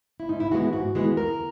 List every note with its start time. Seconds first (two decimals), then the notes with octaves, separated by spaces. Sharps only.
0.20 E4
0.29 G#2 D#4
0.40 E4
0.51 E3 G#3 B3 F#4
0.62 E4
0.73 G#2 F#4
0.95 E3 G#3 B3
1.17 E2 A#4